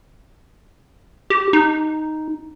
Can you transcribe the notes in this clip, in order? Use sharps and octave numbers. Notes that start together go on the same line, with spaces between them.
G4
D#4